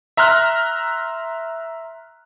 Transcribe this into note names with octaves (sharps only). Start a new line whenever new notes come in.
E5 A#5 C6 F6 F#6